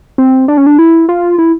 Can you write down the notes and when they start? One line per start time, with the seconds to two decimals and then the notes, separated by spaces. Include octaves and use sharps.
0.18 C4
0.48 D4
0.57 C#4
0.66 D4
0.79 E4
1.09 F4
1.38 E4